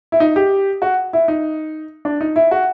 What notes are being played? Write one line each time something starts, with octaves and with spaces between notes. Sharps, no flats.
E4
D#4
G4
F#4
E4
D#4
D4
D#4
E4
F#4